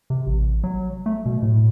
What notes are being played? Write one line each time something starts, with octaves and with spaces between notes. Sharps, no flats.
C3
A1
F#3
A3
B2
A2